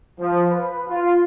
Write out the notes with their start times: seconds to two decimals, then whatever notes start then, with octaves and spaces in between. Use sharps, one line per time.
0.19 F3
0.50 B4
0.88 F4